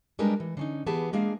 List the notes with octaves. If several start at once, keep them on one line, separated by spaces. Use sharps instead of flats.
G3 G#3 D4 G4 A#4 B4
E3
D3 C#4 D#4
E3 B3 G4 G#4 A5
G#3 A#3 D4 G#4 F5